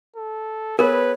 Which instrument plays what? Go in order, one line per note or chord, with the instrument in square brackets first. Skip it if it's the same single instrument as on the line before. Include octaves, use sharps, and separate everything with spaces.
[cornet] A4
[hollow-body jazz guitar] B3 G#4 [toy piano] A#4 [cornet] B4 [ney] C#5